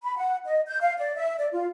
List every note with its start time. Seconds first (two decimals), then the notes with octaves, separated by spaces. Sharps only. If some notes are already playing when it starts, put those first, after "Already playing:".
0.03 B5
0.17 F#5
0.46 D#5
0.67 G6
0.81 F5
0.98 D5
1.16 E5
1.38 D5
1.53 F4